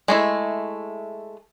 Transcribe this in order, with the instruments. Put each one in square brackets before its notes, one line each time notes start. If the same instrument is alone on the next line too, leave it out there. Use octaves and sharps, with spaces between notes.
[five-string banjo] G#3 A3 E4